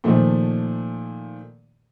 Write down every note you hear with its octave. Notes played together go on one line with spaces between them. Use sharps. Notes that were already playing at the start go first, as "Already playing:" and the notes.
A#2 D#3 F3 A3